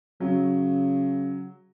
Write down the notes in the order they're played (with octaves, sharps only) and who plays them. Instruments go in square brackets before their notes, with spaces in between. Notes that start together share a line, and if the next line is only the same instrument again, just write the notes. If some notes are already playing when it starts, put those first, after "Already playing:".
[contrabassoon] C#3 [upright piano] F#3